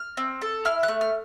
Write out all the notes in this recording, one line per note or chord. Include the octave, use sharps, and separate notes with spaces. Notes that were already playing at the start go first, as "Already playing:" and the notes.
Already playing: F6
C4
A4
E4 F6
F#6
A3
F6